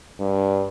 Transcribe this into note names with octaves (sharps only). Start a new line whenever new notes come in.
G2